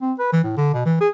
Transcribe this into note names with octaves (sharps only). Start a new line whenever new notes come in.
C4
B4
E3
A2
D3
B2
E3
G#4